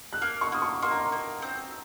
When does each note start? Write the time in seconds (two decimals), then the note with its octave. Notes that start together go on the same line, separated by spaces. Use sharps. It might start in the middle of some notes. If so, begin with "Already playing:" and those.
0.13 F#6
0.21 A#3 F6
0.41 C#6
0.52 A#3 D#6
0.62 C#6
0.82 A#3 C6
0.91 A#5
0.99 C6
1.12 A#3
1.42 C4